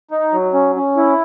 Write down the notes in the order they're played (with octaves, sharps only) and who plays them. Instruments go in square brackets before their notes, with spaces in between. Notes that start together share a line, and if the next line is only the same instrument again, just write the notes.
[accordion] D#4
F#3
C#4
C#4
E4